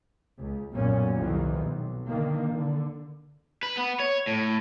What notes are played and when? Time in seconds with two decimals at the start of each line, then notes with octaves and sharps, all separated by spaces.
0.40 C#2
0.74 B1 F#2 A#2 C#4
1.15 C2 F2 D#3 E3 G3
1.60 B1
2.09 D3 D#3 A#3
2.50 D3
3.63 B4
3.77 B3
4.00 C#5
4.27 A2